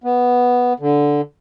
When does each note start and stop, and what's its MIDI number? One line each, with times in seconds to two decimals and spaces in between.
0.04 0.73 59
0.80 1.21 50